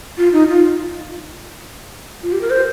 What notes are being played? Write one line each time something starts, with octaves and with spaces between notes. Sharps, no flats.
F4
D#4
F4
F4
G4
A#4
C5